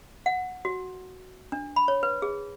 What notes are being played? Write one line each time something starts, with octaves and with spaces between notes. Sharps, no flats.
F#5
F#4
D4
B5
C#5
B4
G#4